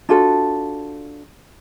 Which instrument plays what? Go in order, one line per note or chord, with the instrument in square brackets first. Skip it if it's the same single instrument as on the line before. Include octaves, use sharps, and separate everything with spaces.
[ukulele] D4 F4 F#4 A4